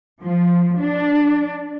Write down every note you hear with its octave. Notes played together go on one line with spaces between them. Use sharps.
F3
D4